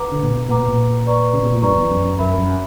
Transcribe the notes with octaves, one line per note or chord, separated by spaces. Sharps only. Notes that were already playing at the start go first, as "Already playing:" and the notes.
Already playing: B4 F#5 A#5 D6
D3
A#2
B2
A#2 B4 F#5 A#5 D6
B2
A#2
B4 D5 A#5 C#6
C#3
B2
A#2
G2 B4 D5 A#5 C#6
E2
F#2
F#2
F#2 A#4 E5 B5
F#2